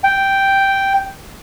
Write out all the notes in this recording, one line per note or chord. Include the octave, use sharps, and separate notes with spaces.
G5